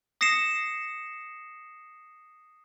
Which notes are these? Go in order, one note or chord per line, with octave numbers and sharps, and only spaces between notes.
D#6 A#6 C7 C#7 E7